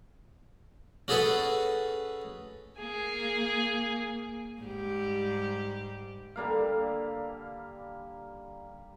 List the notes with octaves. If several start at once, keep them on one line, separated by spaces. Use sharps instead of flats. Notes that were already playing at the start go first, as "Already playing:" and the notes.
C#4 F#4 G#4 A4 B4 C#5
A#3 G#4
G#2 G3 G4
D3 G3 A#3 F5